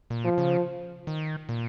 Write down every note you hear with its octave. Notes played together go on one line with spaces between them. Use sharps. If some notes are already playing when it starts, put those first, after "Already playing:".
A#2
F3
C#3
D#3
A#2